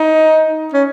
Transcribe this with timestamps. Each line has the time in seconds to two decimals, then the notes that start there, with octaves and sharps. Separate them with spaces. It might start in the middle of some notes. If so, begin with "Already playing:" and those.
Already playing: D#4
0.73 C#4